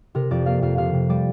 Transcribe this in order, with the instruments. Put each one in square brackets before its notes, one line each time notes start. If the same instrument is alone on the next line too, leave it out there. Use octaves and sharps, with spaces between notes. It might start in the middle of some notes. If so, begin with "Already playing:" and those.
[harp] C3 A#4
F2 D5
A#3 F5
F2 F5
C3 F5
C3
G3 D5